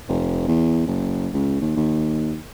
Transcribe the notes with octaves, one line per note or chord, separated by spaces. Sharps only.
F1
E2
F#1
C#2
D#2
D#2